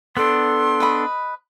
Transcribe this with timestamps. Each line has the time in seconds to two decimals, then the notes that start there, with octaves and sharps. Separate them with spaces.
0.17 B3 D4 A4 C6
0.80 B4 D#5 B5